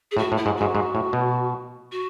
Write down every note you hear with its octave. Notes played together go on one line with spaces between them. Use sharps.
G#4
A2 F#4
A2
E4
G#2
G#2 F#4
G#2
A2
B2
F#4